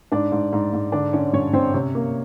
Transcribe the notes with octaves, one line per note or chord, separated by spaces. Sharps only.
G#2 D4 D5
G#2
G#2
G#2
D3 D4 D5
D3 C#4 C#5
G2 C#4 C#5
G2 C4 C5
C3 C#4 C#5
A#3